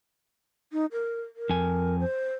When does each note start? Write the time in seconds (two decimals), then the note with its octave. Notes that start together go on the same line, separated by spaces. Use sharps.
0.72 D#4
0.92 A#4
1.36 A#4
1.50 F2 G#5
1.99 C5